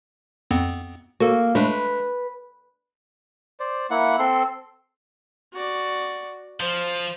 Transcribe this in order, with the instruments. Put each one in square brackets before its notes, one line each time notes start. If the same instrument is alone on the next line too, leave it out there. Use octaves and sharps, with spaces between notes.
[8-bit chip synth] F2 B3 C4
[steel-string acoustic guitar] A#3 [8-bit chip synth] F#4 A4
[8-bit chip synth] G#3 A3 D4 [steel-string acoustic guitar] B4
[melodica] C5 D5
A#3 E4 F#5
C4 A4 C6
[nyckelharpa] F#4 D5
[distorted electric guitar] F3 [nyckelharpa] C5